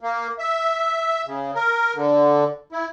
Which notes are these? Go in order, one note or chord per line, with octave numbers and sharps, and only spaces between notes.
A#3
E5
C#3
A#4
D3
E4